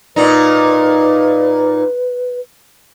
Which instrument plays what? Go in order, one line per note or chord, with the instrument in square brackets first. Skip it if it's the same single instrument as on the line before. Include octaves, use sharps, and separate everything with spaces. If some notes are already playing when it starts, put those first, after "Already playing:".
[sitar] A#2 D#4 [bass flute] B4